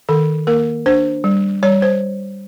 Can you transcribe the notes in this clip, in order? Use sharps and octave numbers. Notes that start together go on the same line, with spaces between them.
D#3 A4
A#3 A#4
D4 C5
G3
G3 C#5
C5